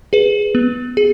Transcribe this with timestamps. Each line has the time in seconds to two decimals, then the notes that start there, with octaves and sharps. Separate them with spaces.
0.13 G#4 B4
0.55 B3
0.97 G#4